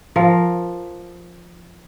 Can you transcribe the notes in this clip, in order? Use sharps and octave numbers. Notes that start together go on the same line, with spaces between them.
F3 A#4